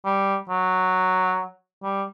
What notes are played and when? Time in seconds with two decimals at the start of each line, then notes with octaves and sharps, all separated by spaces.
0.05 G3
0.49 F#3
1.83 G3